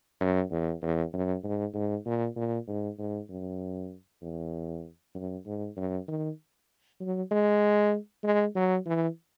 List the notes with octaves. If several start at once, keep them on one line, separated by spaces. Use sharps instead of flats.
F#2
E2
E2
F#2
G#2
G#2
A#2
A#2
G#2
G#2
F#2
E2
F#2
G#2
F#2
D#3
F#3
G#3
G#3
F#3
E3